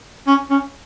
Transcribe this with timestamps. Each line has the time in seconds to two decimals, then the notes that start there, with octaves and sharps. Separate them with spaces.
0.27 C#4
0.50 C#4